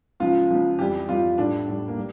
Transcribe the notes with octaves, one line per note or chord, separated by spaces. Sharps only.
C#2 C#3 F3 F4
C#2 C#3 F3
F2 E3 G3 G4
F2 E3 G3 F4
A2 G3 D4
A2 G3
A#3
G3